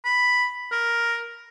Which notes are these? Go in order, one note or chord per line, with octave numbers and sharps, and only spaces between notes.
B5
A#4